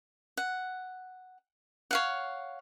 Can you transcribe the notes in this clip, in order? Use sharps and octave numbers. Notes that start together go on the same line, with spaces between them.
F#5
C#5 F5 F#5